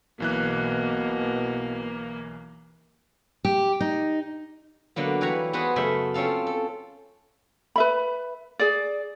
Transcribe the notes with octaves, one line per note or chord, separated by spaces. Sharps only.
B1 B2 E3 A#3 F#6
G4
D#4
D3 F#3 A#3 B3
E3 G3 B4 C#5 G#5 A#5
B3 F#4 G#4 B4 C5
F#2 C#3 A3 E5 B5
C4 C#4 F4 A4 F5
A4
B4 E5 B5
G#4 D5